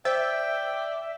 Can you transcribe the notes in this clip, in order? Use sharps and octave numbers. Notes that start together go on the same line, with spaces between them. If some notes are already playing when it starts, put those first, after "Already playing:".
C5 D5 E5 G5